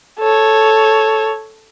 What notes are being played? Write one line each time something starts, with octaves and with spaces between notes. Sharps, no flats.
A4 C#5